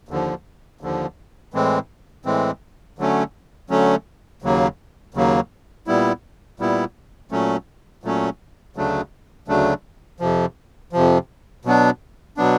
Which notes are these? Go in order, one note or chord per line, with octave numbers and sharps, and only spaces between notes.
D#2 D3 F3
D#2 D3 F3
A2 E3 G#3 C4
A2 E3 G#3 C4
D3 F#3 A3 C#4
D3 F#3 A3 C#4
D#2 C#3 F#3 A#3
D#2 C#3 F#3 A#3
A#2 G3 B3 E4
A#2 G3 B3 E4
A#2 F#3 A3 C#4
A#2 F#3 A3 C#4
D2 C#3 F#3 A3 D4
D2 C#3 F#3 A3 D4
F2 C3 F3
F2 C3 F3
B2 F#3 B3 D4
B2 F#3 B3 D4